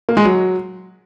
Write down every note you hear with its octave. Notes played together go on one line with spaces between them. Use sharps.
A#3
G#3
F#3